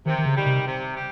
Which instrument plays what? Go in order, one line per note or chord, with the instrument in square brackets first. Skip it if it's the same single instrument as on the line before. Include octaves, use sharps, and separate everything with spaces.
[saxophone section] C3 [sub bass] D#3
[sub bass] D#3
C#3
[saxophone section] D#3 G3
[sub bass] C3
[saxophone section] C3
G3